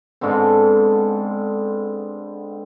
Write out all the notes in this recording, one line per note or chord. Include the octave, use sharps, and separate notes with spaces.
G#2 D3 B3 C4